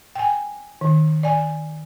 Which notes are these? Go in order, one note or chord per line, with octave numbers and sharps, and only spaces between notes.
G5 G#5
D#3
D5 G#5